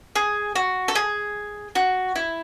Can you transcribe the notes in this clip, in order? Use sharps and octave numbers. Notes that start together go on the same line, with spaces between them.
G#4
F#4
A4
G#4
F#4
E4